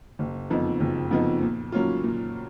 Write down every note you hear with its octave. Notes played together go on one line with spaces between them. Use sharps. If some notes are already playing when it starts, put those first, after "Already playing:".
F#1
F2 F3 B3 D#4
F#1
F2 F3 B3 D#4
A#2
F#3 A#3 C#4 F4
A#2